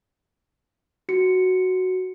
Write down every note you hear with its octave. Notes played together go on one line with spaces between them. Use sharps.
F#4 C#7